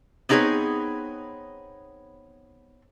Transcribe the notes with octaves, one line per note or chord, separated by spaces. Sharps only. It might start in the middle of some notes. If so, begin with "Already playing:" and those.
B3 C4 D#4 G#4 B4 C#5